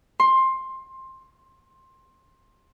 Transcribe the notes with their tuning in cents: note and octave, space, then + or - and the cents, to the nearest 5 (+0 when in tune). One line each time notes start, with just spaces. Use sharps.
C6 +15